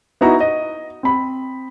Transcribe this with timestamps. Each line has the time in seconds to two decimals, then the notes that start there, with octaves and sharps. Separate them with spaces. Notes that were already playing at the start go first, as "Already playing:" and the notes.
0.21 B3 D#4 E4 F#4 A#5
0.40 D#5
1.03 C4 B5